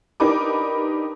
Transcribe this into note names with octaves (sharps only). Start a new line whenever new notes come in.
D4 D#4 G4 A#4 B4 D6